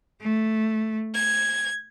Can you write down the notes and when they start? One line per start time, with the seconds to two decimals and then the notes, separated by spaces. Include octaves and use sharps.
0.20 A3
1.14 G#6